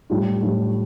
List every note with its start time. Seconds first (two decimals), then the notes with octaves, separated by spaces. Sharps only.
0.10 A2 G3 D4 F4
0.42 A2 G3 D4 F4